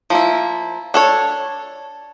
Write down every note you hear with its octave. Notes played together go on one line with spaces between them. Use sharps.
F3 A#3 E4
D4 A4 C#5